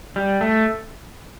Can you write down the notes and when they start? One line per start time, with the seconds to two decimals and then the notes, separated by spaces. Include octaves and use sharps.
0.16 G3
0.41 A3